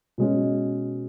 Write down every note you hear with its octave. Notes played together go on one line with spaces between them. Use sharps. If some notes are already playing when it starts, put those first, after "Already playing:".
B2 G#3 C#4